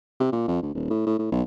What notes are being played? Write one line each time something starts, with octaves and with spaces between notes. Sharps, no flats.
C3
A#2
F2
D2
D#1
A2
A2
A2
B1